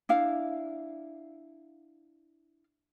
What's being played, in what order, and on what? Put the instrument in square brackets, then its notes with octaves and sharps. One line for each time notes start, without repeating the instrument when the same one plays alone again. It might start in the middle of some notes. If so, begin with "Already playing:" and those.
[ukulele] D4 E4 F5